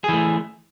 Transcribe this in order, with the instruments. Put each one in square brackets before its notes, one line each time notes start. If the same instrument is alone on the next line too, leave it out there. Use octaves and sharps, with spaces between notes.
[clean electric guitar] G#4
E3
A3